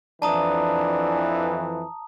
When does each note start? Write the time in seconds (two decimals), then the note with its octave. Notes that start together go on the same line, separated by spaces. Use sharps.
0.22 F2 E3 D4 A5 A#5 D#6